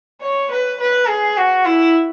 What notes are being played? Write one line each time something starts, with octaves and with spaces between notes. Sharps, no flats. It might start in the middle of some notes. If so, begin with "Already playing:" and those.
C#5
B4
B4
G#4
F#4
E4